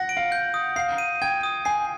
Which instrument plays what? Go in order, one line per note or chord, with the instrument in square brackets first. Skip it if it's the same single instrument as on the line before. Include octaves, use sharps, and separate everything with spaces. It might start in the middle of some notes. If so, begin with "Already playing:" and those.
Already playing: [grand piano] F#5 [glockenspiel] A#6
[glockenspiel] D7
[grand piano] F5
[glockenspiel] G6
D#6
[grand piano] F5 [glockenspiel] C7
[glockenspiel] D#7
[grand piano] G5 [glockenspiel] G#6
[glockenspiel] D#6
[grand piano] G#5 [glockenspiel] C7